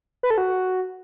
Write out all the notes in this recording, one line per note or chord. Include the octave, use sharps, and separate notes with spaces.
B4
A4
F#4